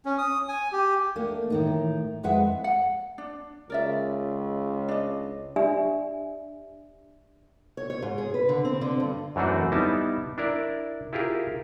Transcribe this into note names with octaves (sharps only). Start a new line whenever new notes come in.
C#4
D#6
G#5
G4
A3 A#3 D4
A2 D#3 D#4
F2 G#3 G#4 B4 E5 F#5
F#5
D4
C#2 A#4 D5 E5
D4 D#5
D4 G4 D5 E5 G#5
C#5
C#5
G#2
G#4
B4
D3
C4
D3
G2
F#2 E3 A3 C4 D4 F#4
G3 B3 D#4 E4 A5
D4 E4 A#4 D5
E4 F4 G4 G#4 A#4